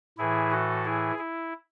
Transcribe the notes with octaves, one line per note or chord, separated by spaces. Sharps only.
A2 E3 E4 G#4
F#4 A4
E4 G#4
E4